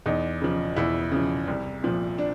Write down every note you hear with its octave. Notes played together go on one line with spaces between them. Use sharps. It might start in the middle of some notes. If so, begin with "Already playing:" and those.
E2 D#4
C#3 F3
E2 E4
C#3 F3
C2
A#2 F3
D4